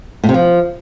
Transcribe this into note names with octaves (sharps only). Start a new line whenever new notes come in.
A2
C3
F3